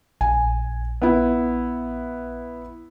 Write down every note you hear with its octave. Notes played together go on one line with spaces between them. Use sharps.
A#1 G#5
B3 E4